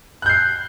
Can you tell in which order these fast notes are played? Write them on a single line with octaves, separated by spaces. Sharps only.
F#6 G6 C7